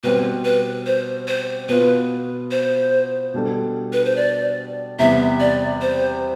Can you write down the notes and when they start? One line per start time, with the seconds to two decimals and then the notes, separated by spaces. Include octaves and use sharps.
0.03 B2 G3 C4 B4
0.45 B4
0.86 C5
1.27 C5
1.69 B2 B3 F4 B4
2.51 C5
3.34 B2 G3 D4 A4
3.93 B4
4.05 C5
4.16 D5
4.99 E2 C3 G3 B3 E5
5.40 D5
5.81 C5